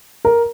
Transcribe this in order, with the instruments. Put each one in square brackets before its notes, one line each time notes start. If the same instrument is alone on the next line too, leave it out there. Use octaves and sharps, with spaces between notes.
[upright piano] A#4